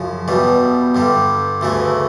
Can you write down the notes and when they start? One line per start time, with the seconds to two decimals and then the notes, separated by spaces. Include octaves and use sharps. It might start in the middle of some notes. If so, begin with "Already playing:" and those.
Already playing: F#2 C#3 F3
0.28 E2 B2 G3
0.95 G2 D3 G3
1.61 D2 C#3 E3 A3